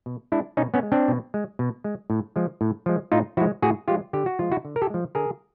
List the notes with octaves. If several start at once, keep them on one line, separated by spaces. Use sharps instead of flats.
B2
G#3 D4 E4
B2 C#4 D#4
B3 C#4
G#3
C4 D4
B2
G#3
B2
G#3
A2
F3 G#3
A2
F3 G#3
A2 D#4 F4
F3 G#3 E4 F#4
A2 F#4 G#4
F3 G#3 F4 G4
D3 G4
F#4
F3 G#3 F4
E4 F#4
D3
A#4
G4 A4
F3 G#3
D3 G#4 A#4